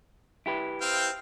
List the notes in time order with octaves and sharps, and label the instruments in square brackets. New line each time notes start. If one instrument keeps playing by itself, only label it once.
[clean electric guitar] E4 G4 B4
[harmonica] C4 F5 G5